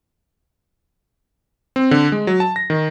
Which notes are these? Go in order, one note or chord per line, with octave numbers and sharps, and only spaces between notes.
C4
D3
G#3
F#3
A5
A#6
D#3